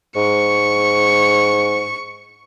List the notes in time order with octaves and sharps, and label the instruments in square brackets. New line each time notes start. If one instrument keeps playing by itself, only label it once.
[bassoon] G#2 [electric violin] C#6